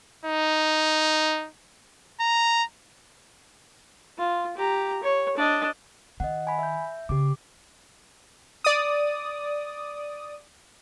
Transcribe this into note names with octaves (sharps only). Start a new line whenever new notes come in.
D#4
A#5
F4
G4 A#5
C#5
D4 D#5
D#3 D#5 F#5
G#5 B5
E5 G6
C#3 G4 D6
D5 D#6